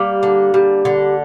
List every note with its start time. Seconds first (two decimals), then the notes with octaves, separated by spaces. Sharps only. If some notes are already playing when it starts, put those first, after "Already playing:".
Already playing: G3 A#3
0.23 D3
0.54 G3
0.85 D3